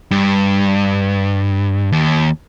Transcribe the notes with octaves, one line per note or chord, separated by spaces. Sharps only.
G2
D#2